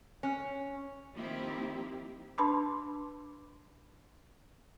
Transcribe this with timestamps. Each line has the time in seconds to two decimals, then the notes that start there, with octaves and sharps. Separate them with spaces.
0.23 C#4
1.15 D#3 F3 A#3 C4 E4 G4
2.38 D4 B4 A5 B5 C6 D6